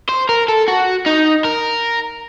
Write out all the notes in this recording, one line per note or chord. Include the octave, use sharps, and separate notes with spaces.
C5
A#4
A4
F#4
D#4
A#4